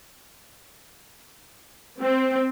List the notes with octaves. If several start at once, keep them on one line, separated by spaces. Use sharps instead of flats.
C4